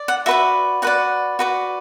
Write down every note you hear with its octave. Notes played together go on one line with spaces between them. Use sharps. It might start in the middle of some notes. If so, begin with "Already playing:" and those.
Already playing: D5
F#5
F#4 B4 D5 E5
F#4 B4 D5 F#5
F#4 B4 D5